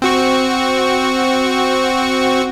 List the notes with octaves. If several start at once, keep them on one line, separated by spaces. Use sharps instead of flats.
C4 F#4 C#6